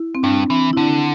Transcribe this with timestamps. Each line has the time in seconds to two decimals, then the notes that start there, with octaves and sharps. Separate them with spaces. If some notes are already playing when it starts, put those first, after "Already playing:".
Already playing: E4
0.15 C4
0.23 G2 D4
0.50 E3 C4
0.73 E4
0.77 D3 D4